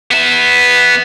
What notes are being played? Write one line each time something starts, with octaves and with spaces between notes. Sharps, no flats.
B3 E5